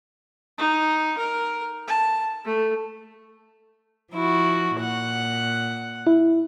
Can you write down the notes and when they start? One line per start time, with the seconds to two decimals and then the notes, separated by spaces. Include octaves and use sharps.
0.58 D#4
1.18 A#4
1.88 A5
2.45 A3
4.13 F3 E4 F#4
4.76 A#2 F#5
6.07 E4